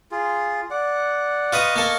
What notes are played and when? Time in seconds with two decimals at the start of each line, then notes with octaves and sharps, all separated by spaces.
0.12 F4 G#4
0.71 D5 F#5
1.53 F4 B4 D#5 C#6 D#6
1.76 A#3 A4